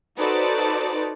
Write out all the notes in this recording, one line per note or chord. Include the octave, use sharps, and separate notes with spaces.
D#4 F#4 A4 B4 C5 D5